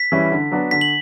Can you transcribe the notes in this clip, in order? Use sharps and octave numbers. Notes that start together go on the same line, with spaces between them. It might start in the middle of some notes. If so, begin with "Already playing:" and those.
Already playing: B6
E3 G3 C#4 E4
D3
F#3 B3 D4 F#4
D3 B6
F#7